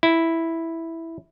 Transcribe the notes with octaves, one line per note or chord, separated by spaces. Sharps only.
E4